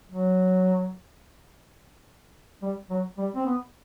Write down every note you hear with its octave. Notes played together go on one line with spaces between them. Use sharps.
F#3
G3
F#3
G3
C4
B3